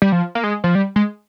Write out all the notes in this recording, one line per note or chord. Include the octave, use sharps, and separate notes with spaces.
G3
F3
A#3
G#3
F3
G3
G#3